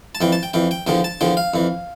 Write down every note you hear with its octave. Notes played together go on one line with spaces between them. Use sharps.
A5
F2 E3 G5
A5
G5
F2 E3 G5
G5
E2 D3 F3 G5
A5
E2 D3 F3 G5
F5
F2 E3